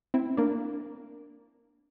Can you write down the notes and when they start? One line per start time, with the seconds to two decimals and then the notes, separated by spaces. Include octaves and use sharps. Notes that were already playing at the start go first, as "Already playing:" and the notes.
0.14 C4 E4
0.37 A#3 D4